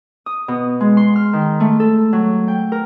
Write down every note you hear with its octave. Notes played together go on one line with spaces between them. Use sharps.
D#6
B2
G#3
C6
F6
D#3
A3
A4
F#3
G5
A#4